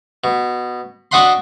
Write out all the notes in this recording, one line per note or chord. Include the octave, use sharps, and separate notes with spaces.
B2
D4 F#4 D#5 F#5 B5 C6